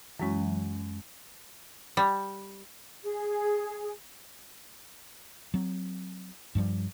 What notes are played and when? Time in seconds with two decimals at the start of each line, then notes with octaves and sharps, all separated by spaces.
0.20 F#2 E3 F#3 G#3 C#4
1.97 G3
3.03 G#4
5.54 F#3 C4
6.55 G2 F3 G3